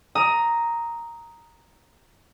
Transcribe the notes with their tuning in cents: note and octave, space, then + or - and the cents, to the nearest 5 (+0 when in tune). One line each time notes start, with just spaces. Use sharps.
A#5 +0 D#6 +15